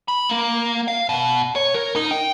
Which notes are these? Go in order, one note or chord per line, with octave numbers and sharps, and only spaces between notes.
B5
A#3
F5
B2
C#5
A#4
D#4
G5